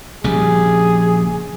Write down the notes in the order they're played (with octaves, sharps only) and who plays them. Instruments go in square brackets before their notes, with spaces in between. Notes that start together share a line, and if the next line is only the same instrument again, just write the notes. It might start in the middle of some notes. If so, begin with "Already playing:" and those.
[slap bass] A#1 C#3 G3 [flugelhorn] G#4